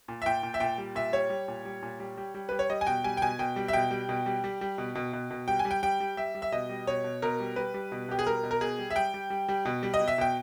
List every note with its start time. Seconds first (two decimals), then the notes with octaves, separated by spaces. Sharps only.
0.08 A#2
0.22 E5
0.26 A#2 G5
0.43 A#2
0.54 E5
0.60 A#2 G5
0.78 G3
0.95 A#2 E5
1.13 G3 C#5
1.30 G3
1.48 A#2
1.65 G3
1.83 A#2
2.00 G3
2.17 G3
2.34 G3
2.49 G3 B4
2.59 C#5
2.70 G3 D#5
2.81 G#5
2.87 B2 G5
3.04 G3 G#5
3.17 G5
3.22 B2 G#5
3.39 B2 G5
3.56 G3
3.68 E5
3.73 B2 G5
3.91 G3
4.09 B2
4.26 G3
4.44 G3
4.61 G3
4.78 B2
4.95 B2
5.13 B2
5.31 B2
5.48 G3 G5
5.59 G#5
5.65 G3
5.71 G5
5.83 G3 G5
6.00 G3
6.17 G3 E5
6.35 G3
6.42 E5
6.52 B2 D#5
6.69 G3
6.87 B2 C#5
7.04 B2
7.22 B2 A#4
7.40 G3
7.56 G3 B4
7.74 G3
7.92 B2
8.09 B2 G4
8.19 G#4
8.27 G3 A#4
8.44 B2
8.51 A#4
8.61 B2 G#4
8.79 G3
8.90 E5
8.96 G3 G5
9.14 G3
9.30 G3
9.49 G3
9.65 B2
9.83 G3
9.94 D#5
10.00 B2
10.08 E5
10.18 B2 G5